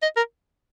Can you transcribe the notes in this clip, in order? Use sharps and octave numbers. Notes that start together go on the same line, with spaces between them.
D#5
A#4